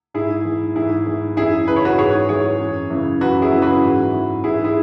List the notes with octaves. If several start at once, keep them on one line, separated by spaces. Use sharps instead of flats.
G#2 E4 G#4
E3
G#2 E4 G#4
E3
F#2 E4 G#4
C#3 E3 B4
C#5
F#4 B4
G#2 G#4 C#5
E3 G#4 C#5
F#2
C#3 E3
F#2 F#4 B4
E4 G#4
C#3 E3
F#4 B4
G#2
E3
G#2 E4 G#4
E4 G#4